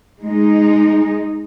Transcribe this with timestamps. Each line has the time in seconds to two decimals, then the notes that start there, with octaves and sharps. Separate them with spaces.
0.21 G#3 D#4